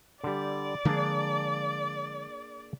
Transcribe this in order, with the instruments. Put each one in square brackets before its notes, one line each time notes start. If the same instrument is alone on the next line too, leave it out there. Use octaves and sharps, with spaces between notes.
[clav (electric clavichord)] D3 G3 [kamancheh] D5
[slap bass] D3 F3 G#3 [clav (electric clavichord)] A#3 D4 G#4